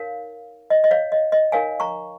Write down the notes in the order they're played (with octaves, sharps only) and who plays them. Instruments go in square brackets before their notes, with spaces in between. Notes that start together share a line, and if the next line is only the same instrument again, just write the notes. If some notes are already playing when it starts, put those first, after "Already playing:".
Already playing: [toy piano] D#4 A#4 C#5 F5
D#5
D#5
C#5 F5
D#5
D#5
D#4 A#4 C#5 F5 G#5
A#5 C#6